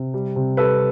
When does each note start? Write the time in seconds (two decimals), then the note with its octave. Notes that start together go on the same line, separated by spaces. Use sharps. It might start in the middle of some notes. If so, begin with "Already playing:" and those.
Already playing: C3
0.14 G3
0.36 C3
0.57 G3 A4 B4